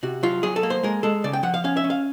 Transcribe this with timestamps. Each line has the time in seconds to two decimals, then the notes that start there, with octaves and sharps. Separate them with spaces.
0.03 C3 F#4
0.23 F#3 F4
0.43 F#3 G#4
0.56 A4
0.63 A#3
0.70 C5
0.83 G#3 A#4
1.03 G#3 A4
1.24 C#3 D5
1.33 G5
1.43 F3 F#5
1.54 F5
1.64 C#4 F5
1.77 E5
1.84 C#4
1.90 F5